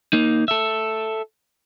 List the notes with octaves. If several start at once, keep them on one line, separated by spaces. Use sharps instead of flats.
A#3 D#4
A4 E5